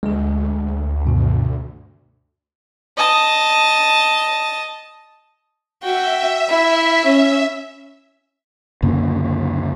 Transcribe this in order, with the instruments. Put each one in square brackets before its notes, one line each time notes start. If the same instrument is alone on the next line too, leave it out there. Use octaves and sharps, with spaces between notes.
[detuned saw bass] D2 [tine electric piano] G#3 G#4
[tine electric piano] G2 B2 D#3
[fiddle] D#5 A5
[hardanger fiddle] F#4 G5 [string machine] E5
[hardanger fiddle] E4
C#4
[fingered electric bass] C#2 F#2 D3 A#3